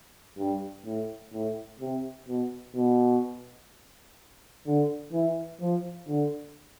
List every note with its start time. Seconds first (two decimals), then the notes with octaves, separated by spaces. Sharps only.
0.38 G2
0.85 A2
1.33 A2
1.80 C3
2.28 B2
2.76 B2
4.67 D3
5.13 E3
5.61 F3
6.08 D3